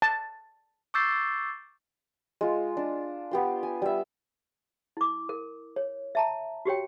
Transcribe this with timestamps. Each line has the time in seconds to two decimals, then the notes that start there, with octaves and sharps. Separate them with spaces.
0.02 A5
0.94 C#6 D6 E6 G6 A6 C7
2.41 G#3 F4
2.77 D4
3.31 B3 G4 C6
3.63 G#5
3.82 G3 E5
4.97 E4 D6
5.29 A#4
5.76 C#5
6.15 E5 A5 A#5
6.65 F#4 G4 C#5 G5